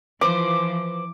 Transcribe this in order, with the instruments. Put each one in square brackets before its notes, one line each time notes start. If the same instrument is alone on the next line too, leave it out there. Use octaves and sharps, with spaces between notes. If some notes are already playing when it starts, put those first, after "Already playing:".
[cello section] E3 F3 [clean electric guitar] B4 C5 [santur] D6